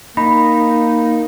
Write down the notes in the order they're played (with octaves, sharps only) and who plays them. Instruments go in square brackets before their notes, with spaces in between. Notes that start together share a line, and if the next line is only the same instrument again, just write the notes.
[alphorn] A#3 [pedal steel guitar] D#4 [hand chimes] B5